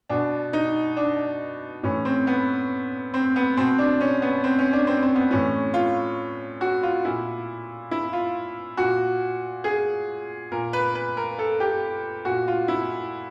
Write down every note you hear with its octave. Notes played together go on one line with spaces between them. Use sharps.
B2 D4
D#4
D4
A2 E3 C#4
C4
B3
C4
B3
B2 C4
D4
C#4
B3
C4
C#4
D4
C4
C4
B3
A2 E3 C#4
F4
F#4
F4
A#2 E4
E4
F4
A#2 F#4
G#4
A#2 A#4
B4
B4
A#4
A4
G4
A#2 F#4
F4
E4